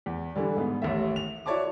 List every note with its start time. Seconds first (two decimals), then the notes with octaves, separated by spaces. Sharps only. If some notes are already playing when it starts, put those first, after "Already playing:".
0.06 E2
0.35 D3 E3 G3
0.57 G#2 B3
0.82 A1 D#2 E5
1.16 F7
1.46 E4 F#4 C#5 D5 A5 D6